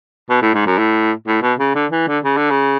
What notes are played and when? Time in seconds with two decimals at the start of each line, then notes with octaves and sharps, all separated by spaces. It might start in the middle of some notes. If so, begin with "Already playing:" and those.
0.30 B2
0.42 A2
0.54 G#2
0.66 F#2
0.78 A2
1.27 A2
1.42 B2
1.59 C#3
1.75 D3
1.91 E3
2.07 D3
2.24 C#3
2.37 D3
2.51 C#3